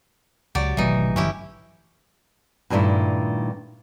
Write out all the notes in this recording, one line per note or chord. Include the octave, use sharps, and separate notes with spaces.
C#2 F#3 G4 D5
G#1 B2 D#3 E3 F#3 A3 D#4
G1 E3 C#4 E4 G4
G2 A#2 D#3 G#3 A3 E4